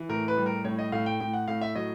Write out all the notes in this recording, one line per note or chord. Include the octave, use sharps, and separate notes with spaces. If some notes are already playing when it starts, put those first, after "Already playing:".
Already playing: E3
A2 A#4
B4
G3
A#4
A2 C#5
D#5
A2 F5
G5
A2 G5
F#5
A2 F5
E5
F#3 D#5